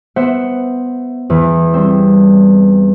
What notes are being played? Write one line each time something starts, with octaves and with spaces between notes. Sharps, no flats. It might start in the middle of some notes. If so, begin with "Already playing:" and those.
B3 C5 E5 F#5
E2 E3
G3 C4